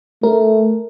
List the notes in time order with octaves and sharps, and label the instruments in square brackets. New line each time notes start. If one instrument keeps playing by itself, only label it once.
[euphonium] A3 [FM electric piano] A#4